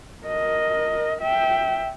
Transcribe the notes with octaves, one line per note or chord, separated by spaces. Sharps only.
A#4 D#5
E5 G5